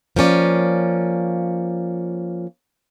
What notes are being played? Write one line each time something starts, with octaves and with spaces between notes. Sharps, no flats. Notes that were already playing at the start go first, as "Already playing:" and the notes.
F3 A#3 C#4 D5